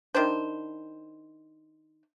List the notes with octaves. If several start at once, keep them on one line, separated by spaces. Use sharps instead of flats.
D#3 D4 E4 C5